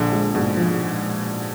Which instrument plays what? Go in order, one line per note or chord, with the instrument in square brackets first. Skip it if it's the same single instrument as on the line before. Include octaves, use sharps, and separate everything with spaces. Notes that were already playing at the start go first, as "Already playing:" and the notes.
Already playing: [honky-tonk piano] A#1 [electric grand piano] D3
[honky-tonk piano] G#3
[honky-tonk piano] G#2 [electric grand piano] B2
[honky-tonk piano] F3